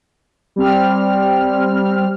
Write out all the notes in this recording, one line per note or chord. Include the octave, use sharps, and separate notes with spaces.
G3 C4 F6